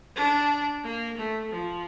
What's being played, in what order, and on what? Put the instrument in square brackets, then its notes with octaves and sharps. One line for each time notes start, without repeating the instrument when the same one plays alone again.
[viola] D4
A#3
A3
F3